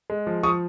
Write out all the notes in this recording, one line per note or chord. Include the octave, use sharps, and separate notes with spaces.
G#3
F3
F3 C#6 D#6